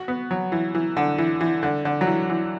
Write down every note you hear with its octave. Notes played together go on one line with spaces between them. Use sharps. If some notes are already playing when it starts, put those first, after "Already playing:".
Already playing: F#4
B3
F#3
E3
E3
D3
E3
E3
D3
D3
F#3
E3
E3